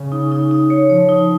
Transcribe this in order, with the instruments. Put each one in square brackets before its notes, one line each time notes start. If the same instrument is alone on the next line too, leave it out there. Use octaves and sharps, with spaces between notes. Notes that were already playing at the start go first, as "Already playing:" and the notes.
Already playing: [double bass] C#3
[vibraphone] D#4
D#4
D#4
C#5
[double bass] F3 [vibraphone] C#5
[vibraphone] D#4